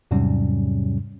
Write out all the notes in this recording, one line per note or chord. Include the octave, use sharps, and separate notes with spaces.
E2 G#2 C3 F#3 G3 C#4